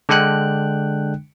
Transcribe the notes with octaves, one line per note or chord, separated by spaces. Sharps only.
D3 G#3 D4 G5 F#6